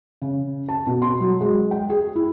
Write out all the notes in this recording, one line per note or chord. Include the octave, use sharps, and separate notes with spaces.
C#3
A5
B2
C6
F#3
G#3
G5
G#4
E4